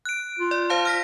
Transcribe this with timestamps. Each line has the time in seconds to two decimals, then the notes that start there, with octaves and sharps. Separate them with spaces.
0.05 F#6 D7
0.39 F4
0.51 D5
0.70 C5 F5 A5
0.85 F6 A#6 B6